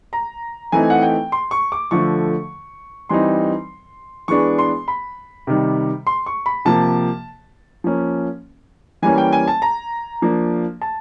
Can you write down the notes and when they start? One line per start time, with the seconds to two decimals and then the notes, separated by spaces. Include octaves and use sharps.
0.13 A#5
0.72 E3 A3 C4 D#4 G#5
0.90 F#5
1.02 G5
1.32 C6
1.51 C#6
1.72 D6
1.91 D3 F3 A3 C#6
3.09 E3 G3 C4 D#4 C6
4.28 E3 G#3 B3 D4 C#6
4.59 C6
4.88 B5
5.47 C3 D#3 G3
6.07 C6
6.26 C#6
6.46 B5
6.65 C3 F3 A#3 A5
7.84 F3 A#3 C#4
9.02 E3 G3 A#3 C#4 G#5
9.18 G5
9.33 G#5
9.48 A5
9.62 A#5
10.22 F3 A#3 D4
10.81 A5